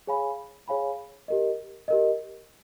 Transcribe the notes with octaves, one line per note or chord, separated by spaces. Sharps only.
G#4 C#5 F5 G#5 B5
G#4 C#5 F5 G#5 B5
G4 A#4 D#5
G4 A#4 D#5